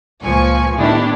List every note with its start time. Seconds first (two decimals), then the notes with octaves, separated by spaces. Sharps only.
0.23 C#2 A#2 F3 G#5 C#6
0.76 A2 D#3 B3 D4 E4 G4